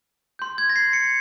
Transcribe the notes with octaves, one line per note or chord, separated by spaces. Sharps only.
C6 G6
G#6
A#6
C7
C#7